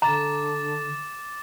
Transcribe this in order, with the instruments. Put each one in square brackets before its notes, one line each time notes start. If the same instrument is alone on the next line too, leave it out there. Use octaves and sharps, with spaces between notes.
[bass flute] D3 [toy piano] A#5 [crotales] D6 A6 E7